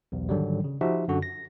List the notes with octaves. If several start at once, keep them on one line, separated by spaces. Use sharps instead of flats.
B1 E2
G#2 D3 D#3 F#3 G3
C#3
F3 D#4 F#4 G4 E5
F#2 D3 F#4
A#6